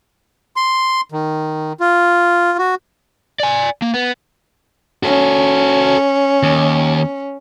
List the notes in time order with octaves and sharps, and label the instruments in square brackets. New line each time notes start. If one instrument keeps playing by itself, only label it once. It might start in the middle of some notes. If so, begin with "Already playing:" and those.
[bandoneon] C6
D#3
F4
F#4
[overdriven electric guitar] D5 G#5
A#3
B3
[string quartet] C#4 [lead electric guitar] F#4 A4
[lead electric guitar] D#2